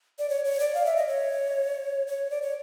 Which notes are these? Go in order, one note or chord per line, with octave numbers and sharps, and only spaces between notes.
D5
C#5
C#5
D5
F5
E5
D#5
C#5
C#5
D5
C#5